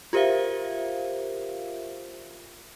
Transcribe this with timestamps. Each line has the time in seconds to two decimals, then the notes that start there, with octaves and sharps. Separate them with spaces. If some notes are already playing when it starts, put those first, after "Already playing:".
0.13 F4 G4 A#4 C5 E5 F5